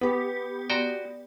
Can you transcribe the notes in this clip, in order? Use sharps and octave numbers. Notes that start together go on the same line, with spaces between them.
B3 G4 B4
F#4 D5 G5 A#5 C6